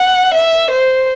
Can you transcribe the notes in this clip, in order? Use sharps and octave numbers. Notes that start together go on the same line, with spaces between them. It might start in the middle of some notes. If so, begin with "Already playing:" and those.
Already playing: F#5
E5
C5